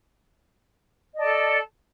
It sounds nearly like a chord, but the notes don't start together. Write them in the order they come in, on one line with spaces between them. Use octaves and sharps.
D#5 D5 A5 A4